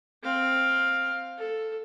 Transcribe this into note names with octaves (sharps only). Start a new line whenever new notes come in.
C4 F5
A4